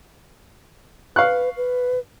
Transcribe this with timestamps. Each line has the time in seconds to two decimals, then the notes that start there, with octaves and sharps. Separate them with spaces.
1.16 B4 F5 C#6 F#6
1.57 B4